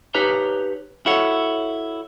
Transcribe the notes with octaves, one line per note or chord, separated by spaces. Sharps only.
D#4 G4 B4 C#5 A#5
E4 F#4 A4 C#5 F#5